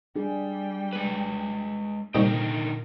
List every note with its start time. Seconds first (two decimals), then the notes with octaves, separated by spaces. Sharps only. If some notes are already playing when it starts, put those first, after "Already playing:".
0.15 G3 D4 G#4 G5
0.93 G#3 B4
2.15 C2 A#2 D3 D#3 D#4 A#4 G5